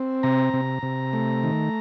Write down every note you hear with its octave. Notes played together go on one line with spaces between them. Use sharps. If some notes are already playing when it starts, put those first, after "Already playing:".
Already playing: C4
C3 A#5
C3
C3
A3
D#3